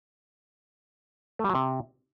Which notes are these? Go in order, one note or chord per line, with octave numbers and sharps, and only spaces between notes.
A3
G3
F#3
C3